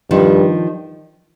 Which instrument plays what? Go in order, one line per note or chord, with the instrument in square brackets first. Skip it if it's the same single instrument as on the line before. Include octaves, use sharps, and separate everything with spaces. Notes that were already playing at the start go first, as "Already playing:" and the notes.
[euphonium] G2 [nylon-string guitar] D#3 F3